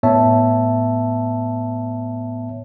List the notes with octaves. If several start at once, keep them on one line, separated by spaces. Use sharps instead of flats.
A2 B3 C#5 E5 A5